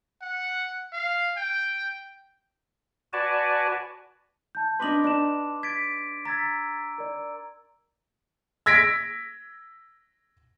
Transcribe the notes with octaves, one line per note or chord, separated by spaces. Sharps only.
F#5
F5
G5
F#4 B4 D5 G#5 A5
A5 G6
D4 D#4 B4 C6 D6 F#7
D4 D5 A5 E7
G#6 A6 B6 D7
A#5 E6 G#6 A6 B6
A#4 D5
E6 G#6 A#6 B6 D7